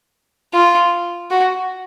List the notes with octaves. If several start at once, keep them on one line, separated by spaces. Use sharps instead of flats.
F4
F#4